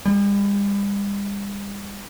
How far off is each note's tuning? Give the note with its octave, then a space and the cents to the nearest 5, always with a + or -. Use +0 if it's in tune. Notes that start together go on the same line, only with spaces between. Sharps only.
G3 +45